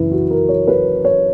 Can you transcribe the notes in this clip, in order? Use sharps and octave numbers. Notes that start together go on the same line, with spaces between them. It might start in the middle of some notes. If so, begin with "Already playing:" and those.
Already playing: F#2 C#3 E3 E4 B4
F#4
A#4
C#5
B4
C#5